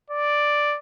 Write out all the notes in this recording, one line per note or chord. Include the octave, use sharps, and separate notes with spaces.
D5